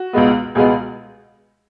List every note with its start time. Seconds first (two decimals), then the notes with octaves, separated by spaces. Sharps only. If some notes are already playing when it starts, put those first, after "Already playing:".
Already playing: F#4
0.13 C#2 B2 G#3 B3
0.55 C#2 B2 G#3 B3 G#4